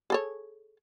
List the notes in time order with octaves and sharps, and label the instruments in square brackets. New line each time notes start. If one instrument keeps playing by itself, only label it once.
[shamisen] G#4 A4 C#5